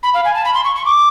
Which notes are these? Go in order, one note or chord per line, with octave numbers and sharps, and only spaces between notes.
B5
F5
G#5
A5
B5
C6
C#6
C#6
D6